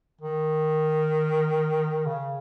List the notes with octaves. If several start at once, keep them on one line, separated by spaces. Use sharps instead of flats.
D#3
C#3